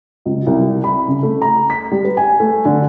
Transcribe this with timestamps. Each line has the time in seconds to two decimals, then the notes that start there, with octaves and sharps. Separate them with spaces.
0.26 C#2
0.47 C2
0.84 B5
1.08 C#3
1.23 A3
1.42 A#5
1.70 B6
1.91 G3
2.04 B4
2.17 G#5
2.40 A3
2.65 D3